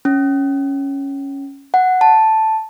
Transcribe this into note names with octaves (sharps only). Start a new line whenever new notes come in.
C#4
F#5
A5